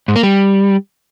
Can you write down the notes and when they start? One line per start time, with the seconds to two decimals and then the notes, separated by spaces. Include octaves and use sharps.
0.08 G#2
0.16 A#3
0.23 G3